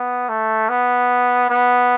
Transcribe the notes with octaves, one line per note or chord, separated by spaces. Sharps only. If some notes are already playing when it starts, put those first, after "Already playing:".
Already playing: B3
A3
B3
B3